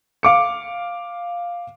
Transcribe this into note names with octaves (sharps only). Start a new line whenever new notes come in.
F5 D6 C#7